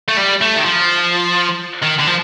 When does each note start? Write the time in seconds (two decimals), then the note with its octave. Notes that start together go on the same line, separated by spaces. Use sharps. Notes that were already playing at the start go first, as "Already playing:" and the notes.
0.08 A3
0.17 G3
0.41 A3
0.56 D#3
0.64 F3
1.83 D#3
1.99 D3
2.07 F3